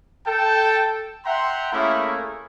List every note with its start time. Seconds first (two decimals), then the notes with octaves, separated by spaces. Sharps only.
0.27 A4 G5 A5
1.26 E5 F#5 G5 A#5 C6
1.73 A3 A#3 C#4 E4 G#4 A#4